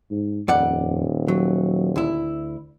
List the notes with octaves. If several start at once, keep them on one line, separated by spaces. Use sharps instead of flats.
G#2
D#1 F2 D5 F#5
F#3
D2 E4